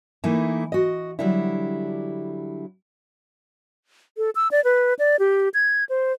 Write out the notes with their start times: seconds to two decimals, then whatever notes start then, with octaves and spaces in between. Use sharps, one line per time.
0.24 E3 A3 A#3 D#4 E4
0.72 F#4 D#5
1.19 D3 F#3 G3 D4 E4
4.17 A4
4.35 E6
4.51 D5
4.64 B4
4.99 D5
5.19 G4
5.54 G#6
5.89 C5